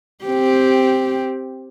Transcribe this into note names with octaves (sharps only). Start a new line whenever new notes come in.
C4 G4